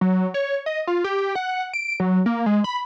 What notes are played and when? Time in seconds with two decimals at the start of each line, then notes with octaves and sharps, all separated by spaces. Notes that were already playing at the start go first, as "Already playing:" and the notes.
0.01 F#3
0.34 C#5
0.66 D#5
0.87 F4
1.04 G4
1.35 F#5
1.73 D7
2.00 F#3
2.26 A#3
2.46 G#3
2.64 B5